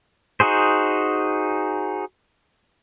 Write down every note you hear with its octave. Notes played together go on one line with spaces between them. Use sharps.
D#4 F#4 G#4 C5